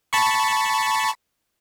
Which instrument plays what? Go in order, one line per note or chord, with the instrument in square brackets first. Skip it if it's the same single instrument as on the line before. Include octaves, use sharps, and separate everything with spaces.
[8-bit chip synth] A5 B5 C#6